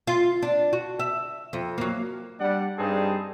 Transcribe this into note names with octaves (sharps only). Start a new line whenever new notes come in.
F4
D4
F#4
E5
F2
F#3 A#3
G3 D4 D5 F#5
G2 G3 C4 D#4 G#4 A5